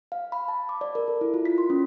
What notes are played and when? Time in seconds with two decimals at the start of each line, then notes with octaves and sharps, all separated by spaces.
0.12 F5
0.32 B5
0.48 A5
0.69 D6
0.81 D5
0.95 A#4
1.08 A4
1.21 E4
1.34 F4
1.45 B6
1.58 C6
1.70 C#4